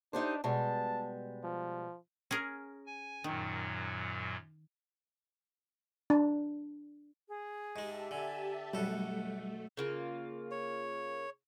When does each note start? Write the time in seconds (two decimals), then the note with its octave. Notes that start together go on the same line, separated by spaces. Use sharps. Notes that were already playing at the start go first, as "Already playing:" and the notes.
0.13 D4 D#4 G4 C5
0.44 B2 G3 G#3 A5
1.43 F3
2.31 C#4 G#4 A#4
2.86 G#5
3.24 F#2 A#2 D#3 F#3
6.10 D4
7.29 G#4
7.76 G#2 G#3 G4 E5 A5
8.11 D3 G#5
8.73 B1 F#2 G3 A3 A4 F#5
9.77 C#3 A#3 F4
10.51 C#5